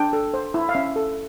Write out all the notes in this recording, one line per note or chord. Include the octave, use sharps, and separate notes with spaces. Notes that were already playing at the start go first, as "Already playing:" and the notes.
Already playing: D4 G5
A4
C5
E4
F5
C#4 E5
A4